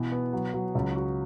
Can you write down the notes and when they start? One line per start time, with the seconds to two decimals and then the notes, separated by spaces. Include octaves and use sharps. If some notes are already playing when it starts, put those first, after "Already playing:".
Already playing: B2 E3
0.12 B3
0.33 F#3
0.54 F#3
0.75 C#2
0.95 F#4